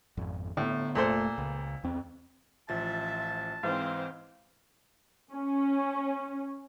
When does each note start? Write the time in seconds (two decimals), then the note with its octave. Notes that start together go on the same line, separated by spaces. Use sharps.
0.17 G#1 F2
0.57 A2 D3 B3
0.95 F1 A#2 A3 A#3 A4 C5
1.38 C#2
1.84 E2 C4
2.69 A1 F3 E5 A5 A6
3.63 G#2 E3 C4 C5 F5
5.32 C#4